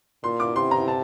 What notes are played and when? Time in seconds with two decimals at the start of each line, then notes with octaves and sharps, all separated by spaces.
0.23 A#2 C6
0.40 D6
0.56 C3 C6
0.71 A#5
0.88 A5